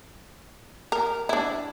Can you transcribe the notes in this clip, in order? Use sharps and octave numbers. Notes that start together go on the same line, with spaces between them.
A#4
D4 E4